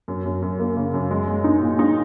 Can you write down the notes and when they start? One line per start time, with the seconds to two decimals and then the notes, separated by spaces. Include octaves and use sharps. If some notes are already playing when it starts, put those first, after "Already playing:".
0.08 F#2
0.25 F#2
0.42 F#2
0.59 A#3
0.77 C#3
0.94 F#2
1.11 G#3
1.28 G#3
1.44 D#4
1.62 A#2
1.79 D#4